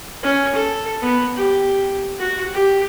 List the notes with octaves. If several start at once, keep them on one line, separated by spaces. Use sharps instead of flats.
C#4
A4
B3
G4
F#4
G4